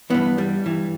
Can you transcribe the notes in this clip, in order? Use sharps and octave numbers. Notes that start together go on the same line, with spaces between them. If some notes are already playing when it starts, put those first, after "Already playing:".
G2 E3 B3
G3
G2 E3